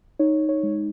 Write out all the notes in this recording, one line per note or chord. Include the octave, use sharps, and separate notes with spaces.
D#4 C#5
C#5
G#3